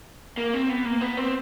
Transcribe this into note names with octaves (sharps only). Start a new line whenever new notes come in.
A#3
C4
B3
A#3
B3
C4